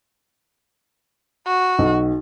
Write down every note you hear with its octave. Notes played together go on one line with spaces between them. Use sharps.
F#4
B1